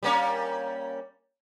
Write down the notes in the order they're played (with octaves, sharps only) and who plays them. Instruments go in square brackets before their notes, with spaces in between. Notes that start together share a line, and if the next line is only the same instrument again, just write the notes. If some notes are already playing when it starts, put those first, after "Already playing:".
[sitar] G3 A#3 C#4